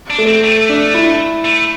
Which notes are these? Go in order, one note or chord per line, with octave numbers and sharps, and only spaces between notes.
D4
A3
C4
A3
D4
E4
A3